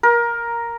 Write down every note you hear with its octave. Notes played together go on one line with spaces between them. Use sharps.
A#4